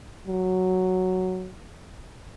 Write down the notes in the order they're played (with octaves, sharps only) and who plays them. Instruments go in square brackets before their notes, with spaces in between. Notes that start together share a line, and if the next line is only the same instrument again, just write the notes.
[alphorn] F#3